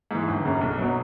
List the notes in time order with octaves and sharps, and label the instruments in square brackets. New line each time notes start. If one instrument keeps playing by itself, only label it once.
[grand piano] G#2 E3
G1
F#2 C#3
B1
B2 F#3